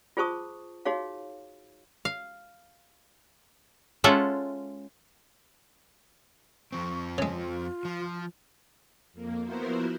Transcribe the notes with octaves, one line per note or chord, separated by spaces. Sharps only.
F4 G#4 C5 A5 C#6 D#6
D#4 F#4 G#4 C#5 F5
F5
G#3 C#4 F4 A4 E5 F#5
F2 F3 C4 C#6
C#3 G#3 F4
F3
F2 A#3
F3 B3 E4 F#4 A#4 C5